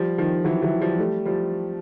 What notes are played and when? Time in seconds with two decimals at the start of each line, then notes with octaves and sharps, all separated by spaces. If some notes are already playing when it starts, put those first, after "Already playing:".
Already playing: F3 G3
0.18 D#3 F3
0.44 E3 F#3
0.62 E3 F#3
0.80 F3 G3
0.99 G3 A3
1.25 F3 G3